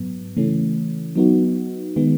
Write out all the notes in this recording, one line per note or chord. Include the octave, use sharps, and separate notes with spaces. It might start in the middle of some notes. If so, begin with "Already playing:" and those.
Already playing: G#2 F#3 B3
C#3 E3 A3 C#4
F#3 B3 D#4 F#4
D#3 G#3 B3